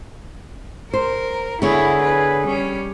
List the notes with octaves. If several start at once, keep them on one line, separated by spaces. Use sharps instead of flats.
A#4 C5
D3 B3 E4 G#4 C#5
B4
G3 C#4